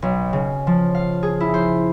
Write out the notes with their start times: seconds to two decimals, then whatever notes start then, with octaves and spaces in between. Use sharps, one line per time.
0.02 B1
0.33 C#3
0.67 F3
0.95 F5
1.23 G#4
1.40 E4
1.54 C5